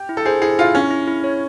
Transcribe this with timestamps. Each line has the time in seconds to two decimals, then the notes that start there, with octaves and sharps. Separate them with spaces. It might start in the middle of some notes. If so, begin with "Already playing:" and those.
Already playing: G4
0.09 E4
0.17 A4
0.25 G#4 C5
0.42 E4 G#4
0.59 E4 F4
0.75 C#4 E4
0.90 E4
1.08 E4
1.24 C#5